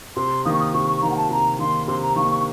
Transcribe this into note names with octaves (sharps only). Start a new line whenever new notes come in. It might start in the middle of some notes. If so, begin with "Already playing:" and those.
C3 C6
D#3 A#3 D#6
C#6
D#6
C3 C#6
C#6
D#3 A#3 A#5
F#5
A5
C3 A#5
D#3 A#3 C6
C3 C6
A#5
D#3 A#3 C#6
C#6